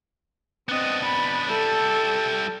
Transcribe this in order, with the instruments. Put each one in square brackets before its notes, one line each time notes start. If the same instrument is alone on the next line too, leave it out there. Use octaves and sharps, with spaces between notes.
[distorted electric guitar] B3 D4 [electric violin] C4 D#5
[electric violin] B5
[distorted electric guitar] G3 E4 [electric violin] A4